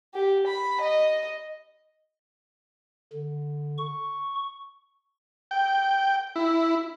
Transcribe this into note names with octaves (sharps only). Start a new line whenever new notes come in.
G4
B5
D#5
D3
C#6
G5
E4